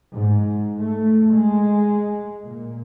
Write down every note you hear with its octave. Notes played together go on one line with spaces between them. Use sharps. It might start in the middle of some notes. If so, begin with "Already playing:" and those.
G#2
A3
G#3
A#2